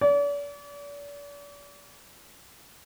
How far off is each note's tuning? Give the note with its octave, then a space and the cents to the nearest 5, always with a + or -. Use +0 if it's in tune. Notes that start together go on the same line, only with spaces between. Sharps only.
D5 -40